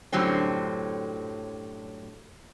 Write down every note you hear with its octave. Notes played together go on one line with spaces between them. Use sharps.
F#2 A2 D3 F#3 G3 C4